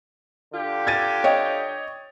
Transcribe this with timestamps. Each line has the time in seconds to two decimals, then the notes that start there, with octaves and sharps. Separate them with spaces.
0.53 D3 F4 G4
0.87 G#6 A6 D#7
1.24 C#5 D#5 G5